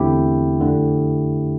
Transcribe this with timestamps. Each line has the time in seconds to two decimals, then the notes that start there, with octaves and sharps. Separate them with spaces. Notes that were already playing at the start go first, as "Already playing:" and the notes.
Already playing: E2 D3 A3 C4 E4 G4
0.61 F2 D3 A3